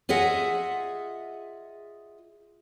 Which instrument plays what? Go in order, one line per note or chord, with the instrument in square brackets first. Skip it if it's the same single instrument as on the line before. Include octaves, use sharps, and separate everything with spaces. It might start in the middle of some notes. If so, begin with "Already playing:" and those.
[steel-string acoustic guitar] F4 G#4 D#5 E5 F#5